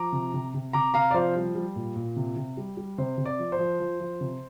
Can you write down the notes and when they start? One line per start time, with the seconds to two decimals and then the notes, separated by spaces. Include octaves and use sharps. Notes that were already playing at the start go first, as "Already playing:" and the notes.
Already playing: F3 A#5 D6
0.12 C3
0.34 C3
0.54 C3
0.73 C3 A#5 D6
0.94 C3 F5 A#5
1.11 D5
1.14 F3 C5 F5
1.36 G3
1.55 G3
1.76 A#2
1.96 A#2
2.16 C3
2.36 C3
2.57 G3
2.77 G3
2.98 C3 C5
3.18 C3
3.25 D5
3.39 F3
3.52 C5
3.59 F3
3.80 F3
4.00 F3
4.21 C3